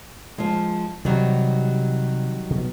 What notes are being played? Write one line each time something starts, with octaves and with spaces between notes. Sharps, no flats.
F3 G#3
C3 D#3 F#3 G3
B2